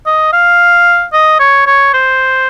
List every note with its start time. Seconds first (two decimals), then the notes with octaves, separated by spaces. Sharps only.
0.06 D#5
0.33 F5
1.13 D#5
1.40 C#5
1.67 C#5
1.93 C5